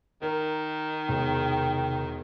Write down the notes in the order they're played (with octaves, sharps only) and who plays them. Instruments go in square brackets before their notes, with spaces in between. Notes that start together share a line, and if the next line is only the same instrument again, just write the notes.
[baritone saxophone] D#3 [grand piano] A#4
[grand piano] E1 [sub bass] C3 [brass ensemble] G5